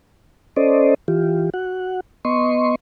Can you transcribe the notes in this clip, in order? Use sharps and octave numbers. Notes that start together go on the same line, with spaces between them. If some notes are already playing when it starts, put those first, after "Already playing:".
C#4 A4 C5 D5 D#5
E3 F4 G4
F#4 F#5
B3 D#5 C6 C#6